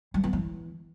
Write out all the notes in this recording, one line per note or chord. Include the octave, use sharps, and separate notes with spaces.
G3
B3
E3